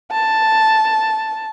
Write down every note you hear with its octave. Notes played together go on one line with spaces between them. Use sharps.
A5